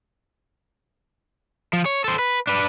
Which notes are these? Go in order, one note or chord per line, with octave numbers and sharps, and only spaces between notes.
F3
C#5
A4 C5
B4
D4 B4